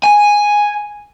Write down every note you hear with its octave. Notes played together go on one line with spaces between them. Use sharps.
G#5